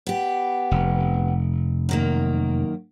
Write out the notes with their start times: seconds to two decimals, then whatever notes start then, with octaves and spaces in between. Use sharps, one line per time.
0.07 B3 G4
0.71 F1
1.89 F#2 D#3 A#3